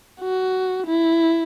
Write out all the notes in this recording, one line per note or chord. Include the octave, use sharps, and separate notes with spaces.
F#4
E4